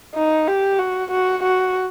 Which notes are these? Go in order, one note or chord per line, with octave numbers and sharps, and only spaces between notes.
D#4
G4
F#4
F#4
F#4